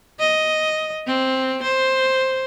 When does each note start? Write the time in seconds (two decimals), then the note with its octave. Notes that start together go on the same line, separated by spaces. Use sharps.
0.19 D#5
1.07 C4
1.63 C5